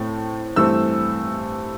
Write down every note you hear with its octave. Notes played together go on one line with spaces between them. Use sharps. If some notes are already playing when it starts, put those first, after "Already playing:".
Already playing: A2 A3 C4
G2 E3 A3 C4 E6